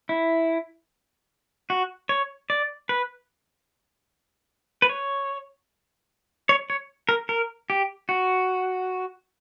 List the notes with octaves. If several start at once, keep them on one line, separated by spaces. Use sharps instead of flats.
E4
F#4
C#5
D5
B4
B4
C#5
C#5
C#5
A#4
A#4
G4
F#4